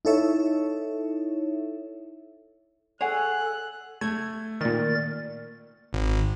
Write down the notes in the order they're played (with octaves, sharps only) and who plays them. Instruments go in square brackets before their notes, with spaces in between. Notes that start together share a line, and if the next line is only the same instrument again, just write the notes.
[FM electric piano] D#4 E4 A4 C#5 E5
[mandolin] G#4 [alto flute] A4 [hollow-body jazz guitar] C#5 F#5 [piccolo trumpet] F#6
[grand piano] A3 [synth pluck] G#6
[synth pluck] A#2 D#3 [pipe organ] A#4 D5 A6
[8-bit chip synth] G#1